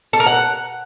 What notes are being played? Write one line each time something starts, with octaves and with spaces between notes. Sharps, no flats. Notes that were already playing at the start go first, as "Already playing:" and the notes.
A4
A#4
F#5